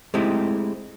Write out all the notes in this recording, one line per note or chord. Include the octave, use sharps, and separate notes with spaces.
G#3 A3 C4 D#4 E4 G4